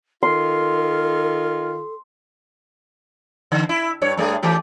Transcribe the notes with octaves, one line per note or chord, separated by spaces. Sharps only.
D#3 F4 A4 C6
D3
E4
G2 C#5
G2 A3 G#4
E3 A3 G4